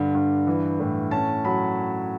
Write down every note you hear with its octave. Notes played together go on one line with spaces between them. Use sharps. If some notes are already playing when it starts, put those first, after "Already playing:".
Already playing: G2 D3
G2
E3
A2
C#4 A5
F#3 B5